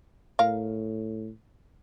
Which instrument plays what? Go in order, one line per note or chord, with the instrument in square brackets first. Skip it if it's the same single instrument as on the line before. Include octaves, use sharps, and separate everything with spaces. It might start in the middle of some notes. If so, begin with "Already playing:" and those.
[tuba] A2 [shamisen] A#4 F5